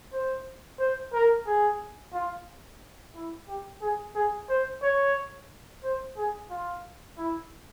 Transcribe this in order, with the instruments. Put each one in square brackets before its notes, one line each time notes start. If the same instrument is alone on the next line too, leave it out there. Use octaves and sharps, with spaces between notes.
[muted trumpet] C5
C5
A#4
G#4
F4
E4
G4
G#4
G#4
C5
C#5
C5
G#4
F4
E4